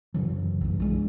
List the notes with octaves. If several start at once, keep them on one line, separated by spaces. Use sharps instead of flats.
F#2 C#3 E3 F#3
B1 G2
E3 G#3 D4